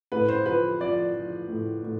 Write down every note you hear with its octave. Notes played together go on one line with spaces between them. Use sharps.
A2 B4
C5
F3 B4
F3 D5
F3
A2
A2